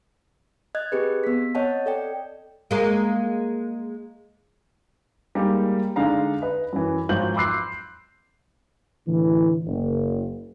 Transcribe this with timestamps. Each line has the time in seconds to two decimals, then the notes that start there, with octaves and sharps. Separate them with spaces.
0.75 D#5 F#6 G#6
0.92 C4 G4 G#4 B4
1.24 B3 B6
1.55 C4 C#5 D#5 F#5 A5
1.86 A4 D5 G5
2.71 G#3 A#3
5.35 G3 G#3 A#3 D#4 G4
5.96 D3 G#3 D4 D#4 F5 A#5
6.42 B4 D#5
6.73 F#2 E3
7.09 G#1 F3 F#3 F4 G6 F#7
7.36 B5 C6 D6 E6 F#6 C7
9.07 A2 D3 E3
9.66 F#1